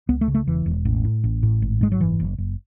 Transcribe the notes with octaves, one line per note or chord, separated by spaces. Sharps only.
C#2 B3
A3
C#3
A3
E1 E3
E1
A1
A2
A1
A2
G#1
G#2 G#3
F#3
F#1 E3
F#1
F#1